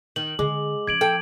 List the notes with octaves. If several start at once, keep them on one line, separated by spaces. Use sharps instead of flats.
D#3 F#7
D3 G#3 D6
F3 C#4 G#6 D7 F#7
A4 G5